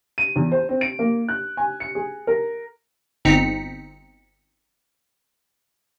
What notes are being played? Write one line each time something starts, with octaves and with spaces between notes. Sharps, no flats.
D#7
E2
C5
C4
D7
A#3
F#6
G#5
C#7
G#4
A#4
G1 C4 D#4 A#5 B6 C#7